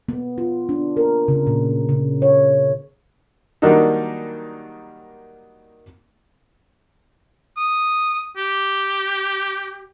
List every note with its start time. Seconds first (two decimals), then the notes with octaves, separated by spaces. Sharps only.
0.09 B3
0.38 F4
0.69 D4
0.97 A#4
1.28 C#3
1.47 A#2
1.89 C#3
2.22 C#5
3.62 D#3 F#3 G3 A#3 D4 D#4
7.57 D#6
8.37 G4